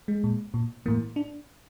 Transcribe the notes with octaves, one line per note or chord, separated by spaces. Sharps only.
G#3
A#2
A#2
A2 E3 A#3
D4